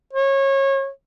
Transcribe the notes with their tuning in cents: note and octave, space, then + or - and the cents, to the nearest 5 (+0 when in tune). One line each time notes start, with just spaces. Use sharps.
C#5 -25